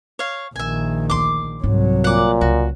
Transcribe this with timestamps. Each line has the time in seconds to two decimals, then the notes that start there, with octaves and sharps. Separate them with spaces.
0.19 C#5 F5
0.56 A#1 D#3 E5 G#5
1.10 D2 C6 D6
1.63 C2 G#2 F#3 C4
2.04 A#2 F#5 D6
2.41 C#2 F#4